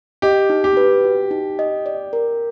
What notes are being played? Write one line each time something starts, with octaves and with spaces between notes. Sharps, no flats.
G4 D#5
D#4
G4
B4
F#4
D#4
D#5
D5
A#4